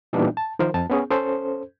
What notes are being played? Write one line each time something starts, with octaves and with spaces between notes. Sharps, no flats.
A#2 E3 G3 B3 D4 D#4
A5
D#3 F3 A#4 C5
F2 A5
B3 C#4 G#4
C#4 A4 C5